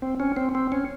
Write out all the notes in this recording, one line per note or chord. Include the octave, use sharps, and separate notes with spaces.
C4
C#4
C4
C4
C#4